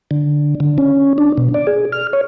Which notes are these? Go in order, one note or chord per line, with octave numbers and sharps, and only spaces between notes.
D3
D3
C#4
D4
B2
D5
G#4
F6
C#5